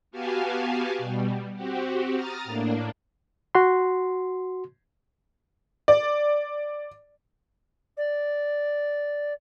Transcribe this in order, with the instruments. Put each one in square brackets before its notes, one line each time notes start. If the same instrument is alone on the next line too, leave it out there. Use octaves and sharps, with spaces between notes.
[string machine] B3 F#4 G4 F5 G#5 A5
B2 G3
C4 F#4 G4
A#5 D#6 F6 A6
A2 A#3 D4
[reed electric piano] F#4 C6
[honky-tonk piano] D5
[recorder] D5